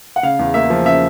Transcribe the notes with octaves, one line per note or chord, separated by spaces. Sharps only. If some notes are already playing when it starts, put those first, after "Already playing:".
F#5
C#3 F5
E2
A#3 E5
F3
C#3 E5